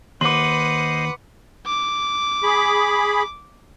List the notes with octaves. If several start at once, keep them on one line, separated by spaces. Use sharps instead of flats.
D#2 B4 C5 D#5 F#5 C6 D6
D6
G#4 B5